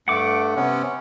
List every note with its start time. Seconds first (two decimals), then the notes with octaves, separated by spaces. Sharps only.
0.08 G2 A3 F#5 D6
0.56 C3 B3 C#4